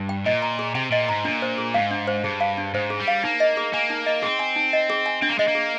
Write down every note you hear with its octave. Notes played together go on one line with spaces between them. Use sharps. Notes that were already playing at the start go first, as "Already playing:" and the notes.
Already playing: G2
G5
A#2 D#5
A#5
G#4
C3 G5
A#2 D#5
G#2 A#5
A#2 D4
C5
G#4
G#2 F5
D4
C5
G2 G#4
F5
D4
G#2 C5
G#4
G3
F5
A#3 D#4
D#5
G#4
A#3 G#5
D#4
D#5
C4 G#4
G#5
D#4
D#5
G#4
G#5
C4 D4
A#3
G#3 D#5
A#3
G#4